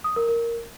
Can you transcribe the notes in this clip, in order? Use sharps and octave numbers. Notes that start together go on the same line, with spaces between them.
D#6
A#4
A#4